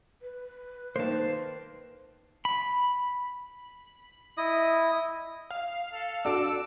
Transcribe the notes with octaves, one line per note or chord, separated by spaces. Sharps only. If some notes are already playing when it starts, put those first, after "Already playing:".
B4
D#3 A#3 C5 A5
B5
E4 D#5 D#6
F5
A4
D4 F#4 A4 D6 E6